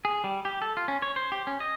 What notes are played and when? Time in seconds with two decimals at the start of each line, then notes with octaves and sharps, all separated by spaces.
0.05 G#4
0.24 G3
0.45 G4
0.62 A4
0.77 F4
0.88 C#4
1.02 C#5
1.16 C5
1.32 G4
1.47 C#4
1.60 D#5